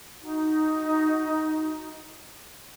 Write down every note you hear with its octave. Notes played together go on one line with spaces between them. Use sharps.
D#4 F#4